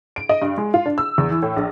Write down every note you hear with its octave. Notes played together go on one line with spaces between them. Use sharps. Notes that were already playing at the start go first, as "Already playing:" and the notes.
D7
D#5
G2
G#3
F4
D4
E6
E2
E3
A2
A#1